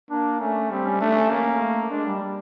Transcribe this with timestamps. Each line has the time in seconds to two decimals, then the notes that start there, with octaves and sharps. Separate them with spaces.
0.10 A#3 D4
0.40 A3 C#4
0.70 G3 C4
0.85 C#4
1.00 A3 D4
1.11 D4
1.15 C#4
1.30 A#3 C#4
1.60 A3
1.90 G#3 D4
2.05 G3
2.20 G3